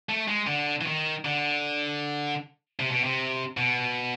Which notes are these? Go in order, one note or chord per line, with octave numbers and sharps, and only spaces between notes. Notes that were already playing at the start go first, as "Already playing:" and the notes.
A3
G#3
D3
E3
D#3
D3
C3
B2
C3
B2